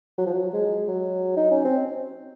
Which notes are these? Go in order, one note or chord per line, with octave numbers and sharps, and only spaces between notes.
F#3
F3
F#3
G#3
F#3
D#4
C#4
C4